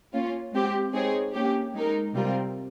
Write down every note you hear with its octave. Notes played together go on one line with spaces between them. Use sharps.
A#3 C#4 F4
G#3 C4 G4
G#3 C4 D#4 G#4 C#5
A#3 C#4 G4
G#3 D#4 A#4
C3 G3 C4 F4 A#4